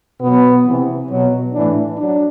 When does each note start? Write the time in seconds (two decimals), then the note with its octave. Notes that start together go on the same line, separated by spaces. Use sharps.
0.21 B2 F#3 B3
0.65 C3 E3
1.09 B2 F#3
1.54 A2 E3 D4
1.98 F#3 D4